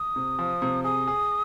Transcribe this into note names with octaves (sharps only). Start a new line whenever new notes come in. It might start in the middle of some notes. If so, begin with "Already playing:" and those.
Already playing: D#6
C3
F3
C3
G#4 D#6
G#4